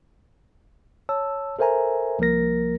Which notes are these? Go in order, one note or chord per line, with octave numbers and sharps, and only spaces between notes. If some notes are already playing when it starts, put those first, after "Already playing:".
C#5 A5 E6
A4 A#4 C5 E5 G#5 A#5
C2 F3 A#3 A#4 A#6